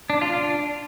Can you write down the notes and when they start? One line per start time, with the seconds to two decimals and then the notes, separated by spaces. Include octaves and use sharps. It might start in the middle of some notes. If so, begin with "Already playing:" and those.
0.10 D4
0.21 F4
0.33 D4